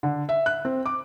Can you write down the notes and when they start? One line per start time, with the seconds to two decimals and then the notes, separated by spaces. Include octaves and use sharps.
0.03 D3
0.29 E5
0.46 F#6
0.65 C4
0.86 D6